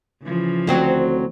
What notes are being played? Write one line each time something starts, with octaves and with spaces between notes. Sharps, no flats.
C#3 E3 F3
D2 F#3 C4